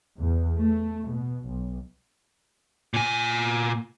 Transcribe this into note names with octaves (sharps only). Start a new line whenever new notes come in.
E2
A3
B2
B1
A#2 G#5